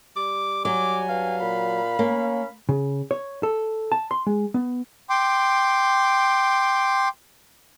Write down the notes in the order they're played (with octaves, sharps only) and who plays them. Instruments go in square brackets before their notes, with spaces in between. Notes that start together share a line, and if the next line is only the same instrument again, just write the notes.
[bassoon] G3 [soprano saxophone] D6
[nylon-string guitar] F#3 [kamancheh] G#5 [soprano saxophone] D6
[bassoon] G2 [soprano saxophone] F5
[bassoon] A#2 [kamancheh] B5
[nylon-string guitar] A#3 [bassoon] C#4
[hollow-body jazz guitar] C#3
C#5
A4
A5
C6
G#3
B3
[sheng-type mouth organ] G5 C6 D6